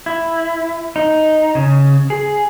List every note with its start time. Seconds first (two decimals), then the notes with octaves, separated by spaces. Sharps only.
0.06 E4
0.96 D#4
1.55 C#3
2.10 G#4